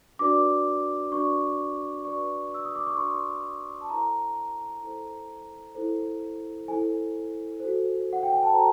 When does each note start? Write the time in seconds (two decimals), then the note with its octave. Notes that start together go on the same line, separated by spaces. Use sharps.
0.19 D4 F#4 B4 D5 D6
1.12 D4 F#4 B4 D5 C#6
2.05 D4 F#4 B4 D5 C#6
2.54 E6
2.65 D#6
2.76 D6
2.87 C#6
2.97 D4 F#4 B4 D5 C6
3.81 A5
3.90 E4 A4 C5 A#5
4.83 E4 A4 C5
5.75 E4 A4 C5
6.68 E4 A4 C5 G#5
7.60 F#4 A4 C5
8.13 F#5
8.23 G5
8.33 G#5
8.43 A5
8.53 F#4 A4 C5 A#5